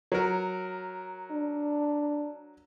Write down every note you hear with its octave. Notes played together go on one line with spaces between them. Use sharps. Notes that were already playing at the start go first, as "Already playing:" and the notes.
F#3 A#4
D4